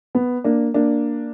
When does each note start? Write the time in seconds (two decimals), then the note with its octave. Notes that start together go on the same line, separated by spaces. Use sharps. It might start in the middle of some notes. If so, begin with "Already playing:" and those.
0.15 B3
0.44 A#3 D4
0.74 A#3 D4